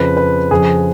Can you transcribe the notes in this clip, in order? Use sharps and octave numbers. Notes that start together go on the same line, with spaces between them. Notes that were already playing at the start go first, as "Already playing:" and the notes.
Already playing: F2 C#3 F3 B4
B4
F2 C#3 F3 G#4